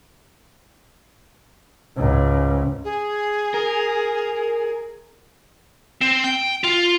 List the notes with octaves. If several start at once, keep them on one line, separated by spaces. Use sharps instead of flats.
C#2 G#2
G#4
A#4
C4
G5
F4